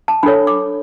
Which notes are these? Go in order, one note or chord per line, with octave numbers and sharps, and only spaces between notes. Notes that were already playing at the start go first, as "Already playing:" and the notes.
A5
D4 A4 C#5 B5
D6